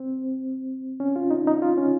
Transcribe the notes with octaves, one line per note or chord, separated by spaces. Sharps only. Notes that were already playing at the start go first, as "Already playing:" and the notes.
Already playing: C4
C#4
F4
D#4
D#4
F4
C#4